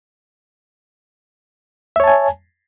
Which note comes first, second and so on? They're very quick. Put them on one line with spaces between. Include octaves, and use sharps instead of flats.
E5 C#5 A5 G#5